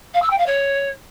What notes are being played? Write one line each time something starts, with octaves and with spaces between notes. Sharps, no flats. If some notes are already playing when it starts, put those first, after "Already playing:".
F5
E6
G5
F5
C#5